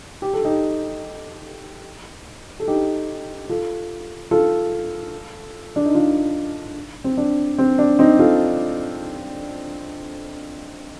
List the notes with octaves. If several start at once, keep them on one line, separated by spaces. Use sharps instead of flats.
G4
A4
D#4 G4
A4
D#4 G4
F4 A4
F4 A4
D4
D#4
D4 F4
C4
D4
C4
D4
C4 D#4
F4 A4